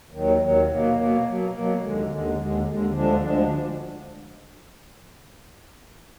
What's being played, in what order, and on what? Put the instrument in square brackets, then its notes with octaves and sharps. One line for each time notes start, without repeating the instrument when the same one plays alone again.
[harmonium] D#2 D#3 F#3
D#2 D#3 F#3
B2 F#3 A#3
B2 F#3 A#3
B2 F#3 A#3
B2 F#3 A#3
D#2 D3 G#3
D#2 D3 G#3
D#2 D3 G#3
D#2 D3 G#3
D2 D3 F3 G#3 D4
D2 D3 F3 G#3 D4